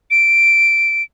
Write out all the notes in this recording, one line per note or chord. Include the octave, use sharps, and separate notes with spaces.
D7